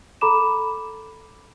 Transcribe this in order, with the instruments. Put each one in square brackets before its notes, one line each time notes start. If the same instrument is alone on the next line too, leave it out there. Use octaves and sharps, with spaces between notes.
[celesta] A4 A#5 B5 D6 E7